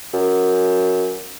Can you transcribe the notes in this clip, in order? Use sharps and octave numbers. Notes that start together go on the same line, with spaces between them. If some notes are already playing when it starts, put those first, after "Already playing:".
F#2